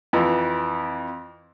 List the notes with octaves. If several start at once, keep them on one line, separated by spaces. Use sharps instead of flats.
F2 E3